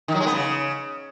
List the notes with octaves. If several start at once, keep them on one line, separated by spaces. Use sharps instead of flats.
D#3
F#3
G#3
B3
C#3